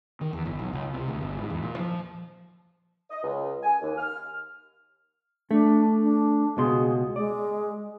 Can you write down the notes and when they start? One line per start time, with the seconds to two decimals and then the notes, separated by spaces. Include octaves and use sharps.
0.21 D#3
0.33 E2
0.45 G1
0.59 B1
0.73 C#2
0.94 C3
1.08 D2
1.21 G1
1.38 G#2
1.50 E2
1.63 A#2
1.79 F3
3.09 D#5
3.23 C#2
3.63 G#5
3.81 D#2
3.98 F6
5.51 A3 D4
6.02 D4
6.57 C#2 B2 G#4 C6
7.16 G#3 D5